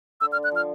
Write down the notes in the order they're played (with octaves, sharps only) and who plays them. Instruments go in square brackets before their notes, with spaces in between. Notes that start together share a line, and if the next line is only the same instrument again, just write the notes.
[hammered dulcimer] D3 [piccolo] E6
[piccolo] F6
[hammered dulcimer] D3
[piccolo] F#6
[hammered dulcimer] F3 [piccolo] F6